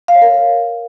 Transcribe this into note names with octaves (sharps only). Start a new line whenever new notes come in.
F5
C#5
A#4